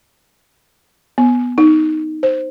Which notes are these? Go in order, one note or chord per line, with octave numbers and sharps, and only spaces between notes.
B3
D#4
C5